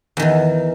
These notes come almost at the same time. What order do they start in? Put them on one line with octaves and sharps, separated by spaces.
E2 D#3 E3